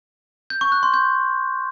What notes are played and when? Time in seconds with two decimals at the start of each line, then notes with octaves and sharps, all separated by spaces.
0.50 G6
0.61 C#6
0.72 F#6
0.83 C6
0.94 G6